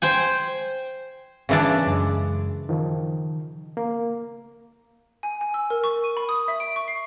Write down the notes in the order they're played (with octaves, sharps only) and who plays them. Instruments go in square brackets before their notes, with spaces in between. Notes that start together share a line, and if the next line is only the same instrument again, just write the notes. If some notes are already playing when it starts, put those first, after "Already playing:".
[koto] C5 G5 G#5
C#3 E3 D4
[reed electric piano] F#2 G#3
D#3 F3
A#3
[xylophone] G#5
G#5
E6
A#4
C#6
D#7
B5
D#6
E5
D7
C#6
C7